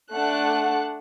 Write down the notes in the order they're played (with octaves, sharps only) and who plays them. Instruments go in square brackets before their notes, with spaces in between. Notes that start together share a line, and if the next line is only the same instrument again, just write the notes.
[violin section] A3 D4 F#5 A5 F#6